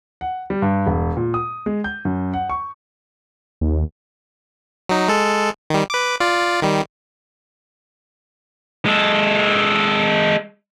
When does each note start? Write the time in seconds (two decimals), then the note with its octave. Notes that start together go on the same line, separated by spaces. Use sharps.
0.21 F#5
0.50 G3
0.62 G2
0.86 E1
1.17 A#2
1.34 D#6
1.66 G#3
1.84 G6
2.05 F#2
2.34 F#5
2.50 C#6
3.61 D#2
4.89 F#3 D#4
5.08 G#3 A4
5.70 D#3 G3
5.90 B4 D6
6.20 F4 D5
6.62 D#3 G3
8.86 G#3 A4